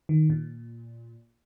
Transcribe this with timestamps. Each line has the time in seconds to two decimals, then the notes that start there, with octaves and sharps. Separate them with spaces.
0.09 D#3
0.30 A#2